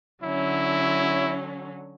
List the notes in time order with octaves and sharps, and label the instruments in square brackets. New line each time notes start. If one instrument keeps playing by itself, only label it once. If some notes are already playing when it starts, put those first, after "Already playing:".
[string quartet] D3 F#3 C#4 [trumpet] E4